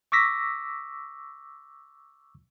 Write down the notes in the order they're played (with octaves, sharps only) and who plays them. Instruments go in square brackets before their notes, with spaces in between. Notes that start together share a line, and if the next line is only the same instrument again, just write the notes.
[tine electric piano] C#6 D6 E6 A#6 B6